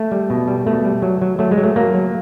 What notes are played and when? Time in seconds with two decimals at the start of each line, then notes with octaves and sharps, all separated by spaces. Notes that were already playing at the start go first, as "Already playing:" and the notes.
Already playing: A3
0.11 G3
0.30 B2
0.48 G3
0.66 B2 A3
0.84 G3
1.02 F#3
1.22 F#3
1.39 F#3 A3
1.51 G#3
1.57 F#3
1.64 A3
1.76 F#3 A#3
1.94 F#3